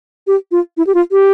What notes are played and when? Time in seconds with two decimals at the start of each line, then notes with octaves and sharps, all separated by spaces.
0.27 G4
0.52 F4
0.77 E4
0.87 G4
0.95 F4
1.12 G4